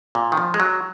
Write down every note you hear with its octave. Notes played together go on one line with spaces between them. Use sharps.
A#2
D#3
F3
G#3
F#3